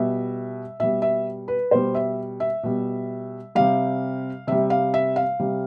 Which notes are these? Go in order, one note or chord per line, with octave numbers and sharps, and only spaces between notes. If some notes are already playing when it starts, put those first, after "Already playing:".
Already playing: B2 G3 E5
B2 G3 E5
E5
B4
B2 G3 C5
E5
E5
B2 G3
C3 G3 F5
C3 G3 E5
F5
E5
F5
C3 G3